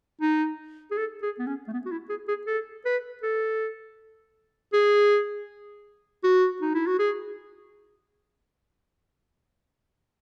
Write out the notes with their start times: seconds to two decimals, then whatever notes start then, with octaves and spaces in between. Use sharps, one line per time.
0.21 D#4
0.91 G#4
0.98 A4
1.22 G#4
1.39 B3
1.47 C#4
1.68 A3
1.73 B3
1.85 F#4
1.91 E4
2.09 G#4
2.28 G#4
2.47 A4
2.85 B4
3.23 A4
4.73 G#4
6.24 F#4
6.62 D#4
6.75 E4
6.87 F#4
6.99 G#4